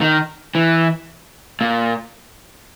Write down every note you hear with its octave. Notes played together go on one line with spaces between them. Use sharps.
D#3
E3
A#2